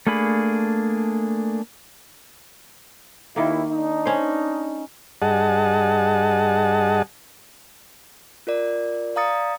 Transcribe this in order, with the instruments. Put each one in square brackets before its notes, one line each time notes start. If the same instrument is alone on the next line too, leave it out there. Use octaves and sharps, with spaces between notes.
[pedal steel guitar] A3 A#3 D4 G#4 B5
[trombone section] D#2 E4 [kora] D#3 A#3
[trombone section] D4 D#4
[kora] C#4 C5
[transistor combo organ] G2 G#4 D#5 F#5 A5
[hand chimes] F4 A#4 D5
D5 F5 A#5 D#6 A6 C#7